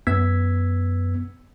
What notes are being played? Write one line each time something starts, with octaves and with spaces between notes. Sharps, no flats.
F#2 B3 E6 G#6 B6